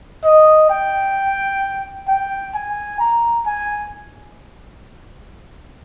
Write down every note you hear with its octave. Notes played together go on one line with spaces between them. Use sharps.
D#5
G5
G5
G#5
A#5
G#5